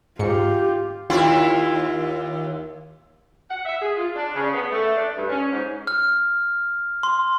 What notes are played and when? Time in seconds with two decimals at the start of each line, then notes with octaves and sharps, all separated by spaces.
0.19 G#2 F4 G4 C#7
1.10 D#2 E4 F4
3.50 F#5
3.64 E5
3.81 G#4
3.96 F4
4.16 D4
4.35 C#3
4.54 B3
4.71 A3
4.96 D4
5.17 G2
5.30 C#4
5.52 G#2
5.87 F6
7.03 C6